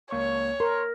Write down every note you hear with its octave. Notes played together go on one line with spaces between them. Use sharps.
C#2 A#3 C#5 C#6
A#4 C6